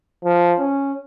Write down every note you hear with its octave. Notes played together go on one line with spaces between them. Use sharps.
F3
C#4